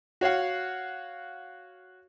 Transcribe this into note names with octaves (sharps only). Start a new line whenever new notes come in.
F#4 C#5 F5 F#5